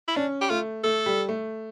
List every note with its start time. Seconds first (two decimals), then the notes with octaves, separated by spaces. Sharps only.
0.08 E4
0.16 C#4 D4
0.41 G4
0.50 A3 F4
0.84 A3 A4
1.06 G3
1.29 A3